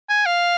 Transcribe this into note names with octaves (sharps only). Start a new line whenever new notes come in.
G#5
F5